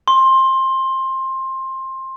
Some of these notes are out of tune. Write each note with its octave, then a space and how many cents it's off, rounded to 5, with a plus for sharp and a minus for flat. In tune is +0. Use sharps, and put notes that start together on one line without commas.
C6 +20